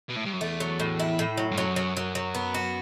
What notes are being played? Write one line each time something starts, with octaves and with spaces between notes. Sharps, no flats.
B2
A2
G2
F#2
E2 A3
F#3
A2
E4
A2
F#3
G2
F#2 F#3
F#3
F#3
F#3
B3
F#4